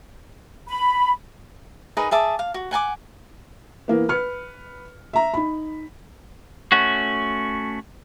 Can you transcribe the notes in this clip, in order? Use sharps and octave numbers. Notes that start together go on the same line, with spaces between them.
B5
D#4 G#4 A#4 B4
G#4 E5 A5 D6
F5
F#4
F#5 G#5 A5 D6
E3 A#3 B3
B4 F6 C#7
E5 A#5
D#4 B5
A3 C#4 F#4